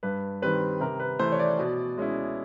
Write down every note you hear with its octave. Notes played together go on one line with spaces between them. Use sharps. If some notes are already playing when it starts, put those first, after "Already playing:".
G2 B4
D#3 G3 C4 B4
C3 A#4
B4
E3 A3 C5
C#5
D5
B2
G#3 C#4 E4